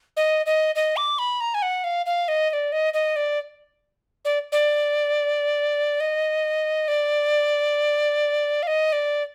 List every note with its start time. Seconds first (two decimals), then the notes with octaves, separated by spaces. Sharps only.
0.17 D#5
0.46 D#5
0.75 D#5
0.97 D6
1.19 B5
1.41 A#5
1.54 G#5
1.62 F#5
1.84 F5
2.06 F5
2.28 D#5
2.50 D#5
2.53 D5
2.72 D#5
2.94 D#5
3.16 D5
4.25 D5
4.52 D5
6.00 D#5
6.88 D5
8.63 F5
8.67 D#5
8.92 D5